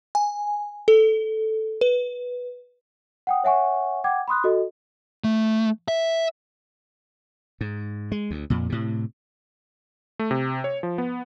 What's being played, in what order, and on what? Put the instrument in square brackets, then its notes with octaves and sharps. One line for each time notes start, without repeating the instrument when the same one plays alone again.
[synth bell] G#5
A4
B4
[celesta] F#5 G5 D#6
C#5 E5 F#5 G#5 C#6
F#5 G5 D6 G#6
B5 C6 D#6 F#6
F#4 A4 D#5
[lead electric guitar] A3
E5
[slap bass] G#2
G#3
D2
F2 A#2
A2 C3
[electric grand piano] A3
C3
C#5
F3
B3